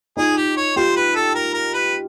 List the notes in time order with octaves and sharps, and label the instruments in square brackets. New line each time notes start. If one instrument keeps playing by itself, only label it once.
[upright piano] D#4 F4 [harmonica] G#4
[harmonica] G4
C#5
[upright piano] F4 G4 [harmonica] C5
[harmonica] B4
A4
A#4
A#4
B4